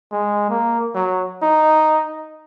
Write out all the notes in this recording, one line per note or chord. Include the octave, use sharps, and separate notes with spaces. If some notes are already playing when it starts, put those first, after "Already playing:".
G#3
A#3
F#3
D#4